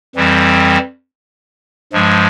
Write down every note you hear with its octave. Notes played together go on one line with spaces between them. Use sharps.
F2 E3 G3 C4
G2 F3 G#3